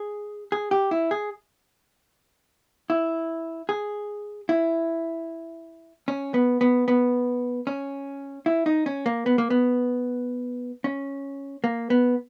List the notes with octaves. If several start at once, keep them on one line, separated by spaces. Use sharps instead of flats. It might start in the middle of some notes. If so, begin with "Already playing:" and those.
Already playing: G#4
G#4
G4
E4
G#4
E4
G#4
E4
C#4
B3
B3
B3
C#4
E4
D#4
C#4
A#3
B3
A#3
B3
C#4
A#3
B3